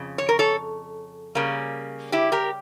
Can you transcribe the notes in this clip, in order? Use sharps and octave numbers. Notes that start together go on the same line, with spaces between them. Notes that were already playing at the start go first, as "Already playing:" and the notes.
Already playing: F2 C#3
C#5
A#4
A4 C#5
C#3 G3 A#3 C#4
E4 G4
G4 A#4